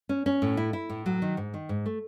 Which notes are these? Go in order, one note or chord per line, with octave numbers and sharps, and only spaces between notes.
C#4
C#4
A2
E4
E4
A2
F#3
D#3
G#2
D#3
G#2
A3